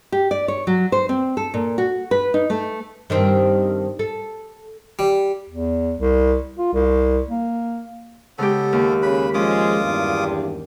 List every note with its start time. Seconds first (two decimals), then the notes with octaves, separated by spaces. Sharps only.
0.12 G4
0.31 D5
0.48 C#5
0.67 F#3
0.92 C5
1.09 C4
1.37 A4
1.54 A#2
1.78 F#4
2.11 B4
2.34 D#4
2.50 A3
3.10 G2 D#3 C4
3.99 A4
4.99 G3
5.50 E2
6.00 C2
6.58 F4
6.73 C2
7.29 A#3
8.38 C#3 G#3 B3 G4 A4
8.73 D#2
9.02 C#3 B4 B5
9.34 F3 G#3 C#4 F4 D6 D#6
9.84 E2 G2